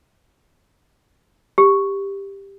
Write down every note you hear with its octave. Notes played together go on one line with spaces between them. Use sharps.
G4